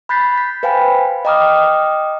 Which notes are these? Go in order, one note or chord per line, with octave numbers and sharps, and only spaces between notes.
B5 F#6 G6 A6 B6 C7
B6
B4 C5 F5 G5 G#5 B5
D#5 G5 A#5 D6 D#6 F6